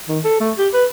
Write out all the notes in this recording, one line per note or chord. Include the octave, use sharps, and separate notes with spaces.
D#3
A4
A3
G4
B4